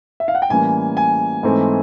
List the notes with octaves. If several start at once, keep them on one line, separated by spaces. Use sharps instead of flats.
E5
F5
F#5
G5
A2 E3 G3 A#3 C#4 G#5
G#5
G#2 E3 A3 C4